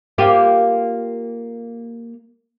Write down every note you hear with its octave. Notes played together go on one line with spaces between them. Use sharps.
A#3 F4 G4